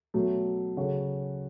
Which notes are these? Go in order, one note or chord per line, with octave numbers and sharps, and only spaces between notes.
B2 F#3 A3
C#3 F#3 C#4 F#4 A4